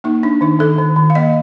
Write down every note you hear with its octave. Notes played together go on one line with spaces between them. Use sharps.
A#3 D#4
D4
D#3 D#4
D#3 A4
D#3
D#3
F5
A#3 D#5